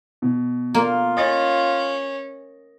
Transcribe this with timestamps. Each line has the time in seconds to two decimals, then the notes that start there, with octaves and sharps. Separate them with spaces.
0.22 B2
0.75 A#3 F4
1.17 C#4 D#5 A6